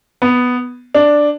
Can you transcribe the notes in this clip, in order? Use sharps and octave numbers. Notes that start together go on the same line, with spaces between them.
B3
D4